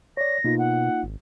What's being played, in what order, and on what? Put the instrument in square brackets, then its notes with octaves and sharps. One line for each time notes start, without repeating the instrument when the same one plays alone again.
[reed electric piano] C#5 D5 [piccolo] A#6
[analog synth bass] B2 [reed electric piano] A#3 D#4 F4
[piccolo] F#5
[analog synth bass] G#1